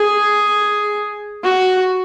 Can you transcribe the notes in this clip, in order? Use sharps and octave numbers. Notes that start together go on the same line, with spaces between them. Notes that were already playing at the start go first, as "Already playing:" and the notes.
Already playing: G#4
F#4